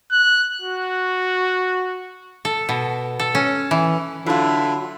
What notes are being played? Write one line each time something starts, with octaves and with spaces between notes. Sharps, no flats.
F#6
F#4
A4
B2
A4
C#4
E3
D3 F#3 D4 E4 F4